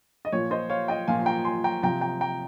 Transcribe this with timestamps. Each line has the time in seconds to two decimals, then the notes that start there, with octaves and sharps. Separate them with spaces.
0.25 D#5
0.32 A#2 F3 C#5
0.51 C5 D#5
0.70 C#5 F5
0.88 D#5 G5
1.08 A#2 F3 F5 G#5
1.26 G5 A#5
1.45 G#5 C6
1.64 G5 A#5
1.83 C3 F3 G5 A#5
2.01 G5 A#5
2.21 G5 A#5